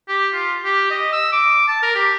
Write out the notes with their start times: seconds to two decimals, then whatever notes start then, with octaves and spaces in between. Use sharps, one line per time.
0.08 G4
0.33 F4
0.65 G4
0.91 D#5
1.12 E6
1.32 D6
1.68 A5
1.82 A#4
1.95 G4